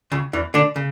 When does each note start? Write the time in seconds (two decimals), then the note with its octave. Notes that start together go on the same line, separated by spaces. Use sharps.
0.12 C#2 C#3
0.33 E2 E3
0.54 D3 D4
0.76 C#3